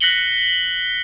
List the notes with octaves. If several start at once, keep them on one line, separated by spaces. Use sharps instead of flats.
F#6 A#6 B6 C#7 F#7 G7